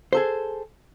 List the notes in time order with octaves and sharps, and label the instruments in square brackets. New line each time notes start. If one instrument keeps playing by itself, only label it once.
[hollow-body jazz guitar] G#4 A4 C5